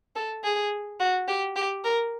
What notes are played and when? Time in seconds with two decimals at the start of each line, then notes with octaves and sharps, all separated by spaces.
0.16 A4
0.44 G#4
1.00 F#4
1.28 G4
1.56 G4
1.84 A#4